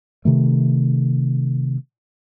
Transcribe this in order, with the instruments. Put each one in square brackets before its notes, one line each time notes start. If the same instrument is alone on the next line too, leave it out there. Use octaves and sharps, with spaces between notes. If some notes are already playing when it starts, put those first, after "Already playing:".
[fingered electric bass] C3 D#3 A3